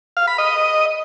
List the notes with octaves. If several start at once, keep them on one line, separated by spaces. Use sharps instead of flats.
F5
B5
D#5